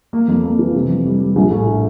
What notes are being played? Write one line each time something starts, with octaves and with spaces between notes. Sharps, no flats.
A#3
F2
A#3
E3
C3
F2
G3
G3
A#1
A2